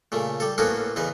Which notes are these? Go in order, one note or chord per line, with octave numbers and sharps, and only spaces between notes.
A#2 C#3 A3
G3 A4
A2 A#3 B3 C#4 F#4 A4
E2 C#3 D#4 B4